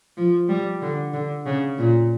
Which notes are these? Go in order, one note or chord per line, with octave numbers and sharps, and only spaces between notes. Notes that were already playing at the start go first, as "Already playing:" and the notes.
F3
G3
D3
D3
C#3
A#2